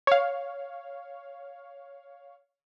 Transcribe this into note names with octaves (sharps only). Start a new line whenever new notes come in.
C#5 F5